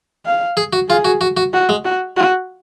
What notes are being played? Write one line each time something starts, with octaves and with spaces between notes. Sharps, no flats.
F5
G#4
F#4
F4 G#4
F#4
F#4
F#4
F#4
G#3
F#4
F#4